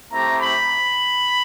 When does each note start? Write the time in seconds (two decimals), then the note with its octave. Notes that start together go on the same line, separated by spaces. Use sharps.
0.11 A3 C4 E4 G4 A#5
0.42 B5